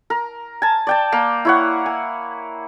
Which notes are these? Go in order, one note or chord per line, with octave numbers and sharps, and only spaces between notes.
A#4
G#5 A5
D5 G5 A5
A#3
E4 C#5 F#5
G#5